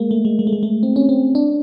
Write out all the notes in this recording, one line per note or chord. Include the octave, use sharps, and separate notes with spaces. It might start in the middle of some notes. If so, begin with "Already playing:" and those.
Already playing: G#3 A#3
A3
G#3
G#3
A3
G#3
A3
C4
C#4
C4
D4